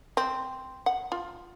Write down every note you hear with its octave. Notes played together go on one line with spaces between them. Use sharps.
C4
F#5
F4